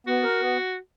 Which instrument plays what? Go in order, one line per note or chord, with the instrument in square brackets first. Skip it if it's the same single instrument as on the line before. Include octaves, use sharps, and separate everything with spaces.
[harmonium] B3 [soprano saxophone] F#4
[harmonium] A#4
B3